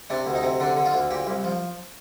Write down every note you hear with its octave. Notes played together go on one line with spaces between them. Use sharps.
C3 D4
D2
D#4
C3
D3 D4
D3
F4
D2
A#2 G4
C2
F3